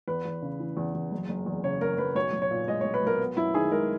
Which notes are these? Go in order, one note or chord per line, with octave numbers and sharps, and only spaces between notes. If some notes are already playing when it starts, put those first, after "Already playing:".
E2 B4
E2
C#3
E3
E2
E2
F#1
F#1
E2
C#3 C#5
F#1 A#4
F#1 B4
B1 C#5
B1
C#5
A#2
G#3 D#5
C#5
B1
B4
B1 A#4
B3
F#2 E4
D#3 G#4
G#3 A#4